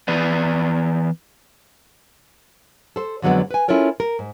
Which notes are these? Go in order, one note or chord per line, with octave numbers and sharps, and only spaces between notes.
E3 B3 B4 D5
A4 C5
F2 D3 F#3 G#3 B3
B4 G#5
C#4 E4 F4 A4 A#4 C#5
A#4
G#2